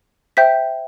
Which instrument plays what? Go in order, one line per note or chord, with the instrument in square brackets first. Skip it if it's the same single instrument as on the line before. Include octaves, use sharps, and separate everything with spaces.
[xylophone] C5 E5 G5 G6 B6